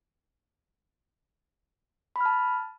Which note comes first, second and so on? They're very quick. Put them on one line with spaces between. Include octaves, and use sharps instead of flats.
B5 F6 A5